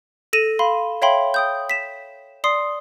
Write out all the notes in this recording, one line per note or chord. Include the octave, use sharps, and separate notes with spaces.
A4 A#6 D#7 E7
F5 B5 C6
C#5 E5 F5 G5 B5 C6
G5 D#6 G6
B6 E7
D5 C6 D#6 C7